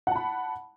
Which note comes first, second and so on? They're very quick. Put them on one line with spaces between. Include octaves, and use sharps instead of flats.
F#5 A5 B5